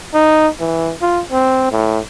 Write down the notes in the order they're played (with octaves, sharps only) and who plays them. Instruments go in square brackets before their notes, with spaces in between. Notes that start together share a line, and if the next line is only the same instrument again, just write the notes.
[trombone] D#4
E3
F4
C4
A2